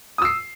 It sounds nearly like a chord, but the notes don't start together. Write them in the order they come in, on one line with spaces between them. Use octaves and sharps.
D#6 E6 C7